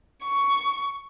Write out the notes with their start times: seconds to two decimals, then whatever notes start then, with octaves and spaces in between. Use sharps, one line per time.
0.23 C#6